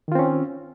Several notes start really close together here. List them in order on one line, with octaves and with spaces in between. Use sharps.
D#3 F4 C4 C#4